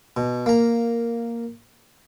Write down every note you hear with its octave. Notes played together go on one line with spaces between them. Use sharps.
B2
A#3 A#5